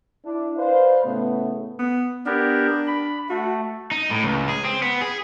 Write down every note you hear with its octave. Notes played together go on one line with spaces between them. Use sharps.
D4 E4
B4 C5 D5 F5
A2 C#3 A3 B3
B3
B3 D4 G4 A#4
B5
A3 F#4
D#4
A2
C#2
G#4
C4
B3
G#4